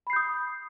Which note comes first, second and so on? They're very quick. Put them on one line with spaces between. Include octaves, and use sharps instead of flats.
B5 C7 G6 D#6